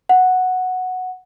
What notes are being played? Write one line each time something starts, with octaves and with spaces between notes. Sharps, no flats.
F#5